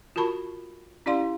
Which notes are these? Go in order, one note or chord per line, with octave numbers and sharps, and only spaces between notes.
F4 F#4 A#4 A5 B5 C#6
C#4 E4 G4 D5 F5 C6